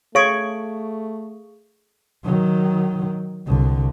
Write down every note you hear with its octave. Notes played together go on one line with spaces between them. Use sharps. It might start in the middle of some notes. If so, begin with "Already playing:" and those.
A3 G#4 C#5 F5 C#6 D#6 D7
D#3 F#3
C2 D3